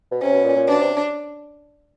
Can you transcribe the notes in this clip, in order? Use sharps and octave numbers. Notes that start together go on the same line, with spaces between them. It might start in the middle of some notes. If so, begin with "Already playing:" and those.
B2
C3 C#4
B2
A#2
A#2
B2 D4
C3